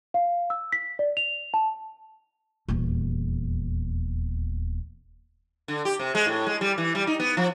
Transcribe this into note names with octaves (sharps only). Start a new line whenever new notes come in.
F5
E6
B6
D5
F7
A5
D#1 E2
D3
G4
C3
G#3
A2
G#3
G3
E3
G3
D#4
B3
F3